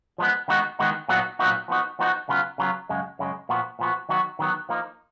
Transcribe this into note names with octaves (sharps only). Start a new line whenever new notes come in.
F3 G#3 B3
D#3 G#3 B3 D#4 F#4
D#3 G#3 B3 D#4 F#4
A#2 F#3 B3 D#4 F#4
A#2 F#3 B3 D#4 F#4
F3 B3 D#4 F#4
F3 B3 D#4 F#4
C#3 F#3 B3 F4
C#3 F#3 B3 F4
F#2 C#3 G#3
F#2 C#3 G#3
A#2 F3 B3 F#4
A#2 F3 B3 F#4
D#3 F#3 B3 F#4
D#3 F#3 B3 F#4
F3 A#3 D#4